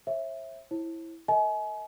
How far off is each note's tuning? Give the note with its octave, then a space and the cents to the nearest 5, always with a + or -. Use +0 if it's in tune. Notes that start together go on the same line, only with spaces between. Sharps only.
C#5 -45 E5 +0
E4 +0 C5 +45
A#4 -30 D#5 +40 G#5 +35